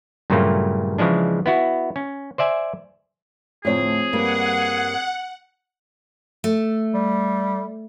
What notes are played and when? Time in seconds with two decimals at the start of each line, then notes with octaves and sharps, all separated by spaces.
0.30 G2 A#2 C#3 F#3 A3 A#3
0.98 C#3 E3 F3 G#3 D4
1.46 B3 E4 F#4
1.96 C#4
2.38 C5 D5 E5 G#5
3.65 D2 A2 F3 C4 G#4 C#5
4.13 G2 G3 A#3 F#5
6.44 A3
6.94 G3